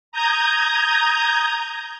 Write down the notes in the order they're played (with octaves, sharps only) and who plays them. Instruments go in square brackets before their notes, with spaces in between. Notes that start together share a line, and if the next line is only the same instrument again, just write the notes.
[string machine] A#5 D#6 G6 G#6